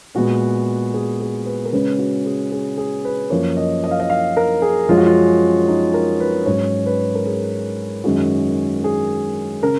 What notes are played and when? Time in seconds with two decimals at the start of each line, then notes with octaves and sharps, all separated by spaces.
0.15 A#2 G#3 B3 F#4
0.94 G#4
1.21 G#4
1.46 B4
1.65 A#4
1.72 C#3 G#3 C#4 B4
1.99 F#4
2.26 G#4
2.52 G#4
2.78 G#4
3.05 B4
3.30 F#2 F3 A#3 C#5
3.56 D#5
3.84 D#5
3.91 F5
4.00 D#5
4.10 F5
4.37 A#4
4.62 G#4
4.88 F#2 F3 G#3 C#4 F4
4.97 F#4
5.06 F4
5.68 D#4
5.94 A#4
6.20 B4
6.46 G#2 F#3 C#4 C#5
6.86 B4
7.15 A#4
7.26 G#4
8.04 F#2 D#3 G#3 C#4 F#4
8.84 G#4
9.63 C#3 A#4